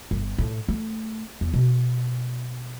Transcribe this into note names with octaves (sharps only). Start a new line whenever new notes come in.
G1
A2
A3
E2
B2